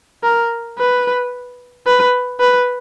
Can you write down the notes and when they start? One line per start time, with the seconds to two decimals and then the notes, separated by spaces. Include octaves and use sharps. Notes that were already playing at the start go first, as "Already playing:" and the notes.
0.23 A#4
0.78 B4
1.86 B4
2.40 B4